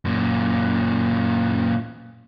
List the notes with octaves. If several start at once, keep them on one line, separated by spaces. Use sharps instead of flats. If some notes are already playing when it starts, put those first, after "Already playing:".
F#2 A#2